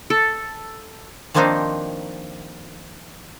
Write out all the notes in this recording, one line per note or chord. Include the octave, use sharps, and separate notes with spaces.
A4
D#3 F3 A#3 C4 D4 D#4